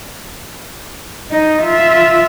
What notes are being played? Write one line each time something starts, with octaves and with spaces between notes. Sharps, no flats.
D#4 D#5
F4 E5